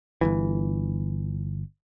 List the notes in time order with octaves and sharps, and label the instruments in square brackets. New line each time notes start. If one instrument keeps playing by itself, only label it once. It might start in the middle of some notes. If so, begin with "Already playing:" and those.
[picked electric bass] G1 C#2 E3